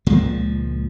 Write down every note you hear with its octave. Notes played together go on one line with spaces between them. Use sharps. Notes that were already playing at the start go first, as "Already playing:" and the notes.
C#2 A#2 F3 G#3